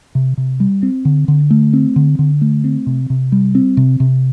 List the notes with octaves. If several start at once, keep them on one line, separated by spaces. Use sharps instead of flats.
C3
C3
G3
C4
D3
D3
A3
C4
D3
D3
A3
C4
C3
C3
G3
C4
C3
C3